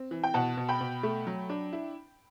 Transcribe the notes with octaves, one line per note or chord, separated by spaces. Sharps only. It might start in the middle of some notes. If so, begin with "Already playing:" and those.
Already playing: C4
E3
G5
B2 F#5 A5
B2
G5 B5
B2
A3
F#3
D4
E4